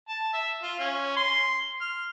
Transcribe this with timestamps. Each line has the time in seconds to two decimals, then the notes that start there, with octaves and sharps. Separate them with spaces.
0.09 A5
0.33 E5
0.63 F4
0.79 C#4
1.16 C6
1.81 F6